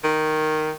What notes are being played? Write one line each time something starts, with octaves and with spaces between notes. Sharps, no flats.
D#3